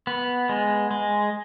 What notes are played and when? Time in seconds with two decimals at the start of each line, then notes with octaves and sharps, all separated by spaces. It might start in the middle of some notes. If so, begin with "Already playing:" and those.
0.07 B3
0.49 G#3
0.91 G#3